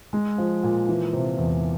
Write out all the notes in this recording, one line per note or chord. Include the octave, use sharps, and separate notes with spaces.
G#3
F3
A#2
E3
C3
E2